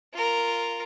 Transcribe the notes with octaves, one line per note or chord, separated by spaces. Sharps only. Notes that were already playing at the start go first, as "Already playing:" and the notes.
F4 A#4